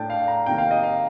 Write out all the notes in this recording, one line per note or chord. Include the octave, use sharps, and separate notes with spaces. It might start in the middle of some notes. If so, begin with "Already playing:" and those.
Already playing: A2 A3 D4 G5 A5
F5
A#5
C3 D#3 A#3 G5
F5
D#5
F5